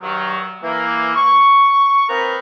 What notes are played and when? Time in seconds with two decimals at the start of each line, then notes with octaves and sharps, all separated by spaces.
0.01 G2 D#3 F#3
0.63 E3 A#3
1.15 C#6
2.09 A#3 C4 D#4 F4 A#4 B4